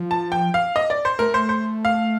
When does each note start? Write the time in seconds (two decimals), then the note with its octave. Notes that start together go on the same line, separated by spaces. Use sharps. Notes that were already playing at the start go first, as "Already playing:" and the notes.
Already playing: F3
0.11 A5
0.32 G5
0.54 F5
0.76 D#5
0.90 D5
1.05 C5
1.19 A3 A#4
1.34 C5
1.49 C5
1.85 F5